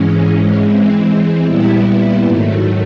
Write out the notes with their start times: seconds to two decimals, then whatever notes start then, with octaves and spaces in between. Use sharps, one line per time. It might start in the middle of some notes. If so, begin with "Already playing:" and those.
Already playing: G#2 E3 G#3 C#4
0.59 E3 G#3 C4
1.42 A#2 G3 B3 E4
2.24 G#2 D#3 F#3 A3